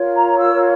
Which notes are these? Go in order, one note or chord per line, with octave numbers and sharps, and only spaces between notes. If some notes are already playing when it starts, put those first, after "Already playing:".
Already playing: F4 A#4 C#5
A#5
E6